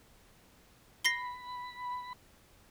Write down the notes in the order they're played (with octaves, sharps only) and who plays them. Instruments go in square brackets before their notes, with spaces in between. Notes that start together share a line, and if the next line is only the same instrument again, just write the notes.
[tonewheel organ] B5 [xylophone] A#6 C7 G7